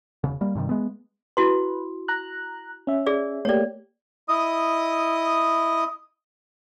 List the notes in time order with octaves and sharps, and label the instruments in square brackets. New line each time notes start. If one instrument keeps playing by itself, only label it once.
[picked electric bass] E1 C#3
G3 A#3
G2 C3 D#3 G3
G#3 B3
[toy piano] E4 F#4 C6 [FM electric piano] B4
[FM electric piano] A#5 F#6
C#4 E5
[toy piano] G#4 D5
[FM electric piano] A3 A#3 G4 [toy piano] C#5 D5
[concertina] E4 D#5 D#6